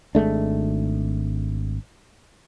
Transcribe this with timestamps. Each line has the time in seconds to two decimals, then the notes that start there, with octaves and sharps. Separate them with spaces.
0.15 G#1 G#3 A3 D4